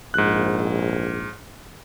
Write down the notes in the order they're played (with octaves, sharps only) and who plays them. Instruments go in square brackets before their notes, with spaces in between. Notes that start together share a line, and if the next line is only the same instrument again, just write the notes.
[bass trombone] A#1 [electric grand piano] G#2 F#6